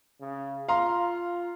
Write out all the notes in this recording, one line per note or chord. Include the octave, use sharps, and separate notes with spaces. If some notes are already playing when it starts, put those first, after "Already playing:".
C#3
F4 F5 A#5 C6